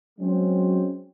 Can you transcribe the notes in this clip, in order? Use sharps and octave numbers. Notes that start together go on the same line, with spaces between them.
F#3 G#3 C4 C#4